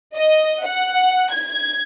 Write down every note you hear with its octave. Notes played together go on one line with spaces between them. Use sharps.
D#5
F#5
G#6